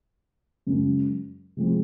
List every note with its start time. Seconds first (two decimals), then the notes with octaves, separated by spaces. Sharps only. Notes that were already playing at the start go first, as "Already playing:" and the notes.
0.67 F#2 C#3 G#3
1.57 C3 F3 G#3 C4